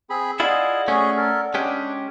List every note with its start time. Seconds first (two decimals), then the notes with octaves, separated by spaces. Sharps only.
0.10 C4 G#4 B5
0.40 E4 F4 G#4 D5 D#5 F#5
0.88 A3 C#4 F#4 G#4
1.17 A4 A#4
1.54 G#3 C#4 D4 G4